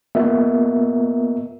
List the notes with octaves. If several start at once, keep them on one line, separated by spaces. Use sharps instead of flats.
A#3 B3 F4 A#4 D#5 E5